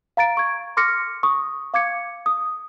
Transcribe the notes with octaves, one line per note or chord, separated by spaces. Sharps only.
F5 A#5 A6 D7
C#6 G#6
C6 D6 F6 A#6 C#7
C#6 D#6
F5 D6 G#6 C#7
D#6